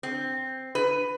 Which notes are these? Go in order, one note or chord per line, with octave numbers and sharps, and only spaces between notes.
C4
B4